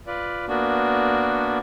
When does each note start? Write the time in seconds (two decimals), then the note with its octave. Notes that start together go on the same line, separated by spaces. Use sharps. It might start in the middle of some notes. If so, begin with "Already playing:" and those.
0.07 F4 B4 D5
0.48 A#3 B3 D4 F#4